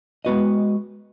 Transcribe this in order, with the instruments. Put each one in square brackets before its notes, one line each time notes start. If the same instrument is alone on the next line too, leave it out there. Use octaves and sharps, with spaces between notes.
[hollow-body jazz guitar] G#3 B3 F#4 B4 D#5